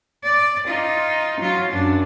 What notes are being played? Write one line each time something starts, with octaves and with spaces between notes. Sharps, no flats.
D5
D#4 F4
F#3 F4
F#2 D4